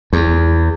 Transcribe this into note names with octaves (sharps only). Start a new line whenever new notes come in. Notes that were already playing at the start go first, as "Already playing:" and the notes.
E2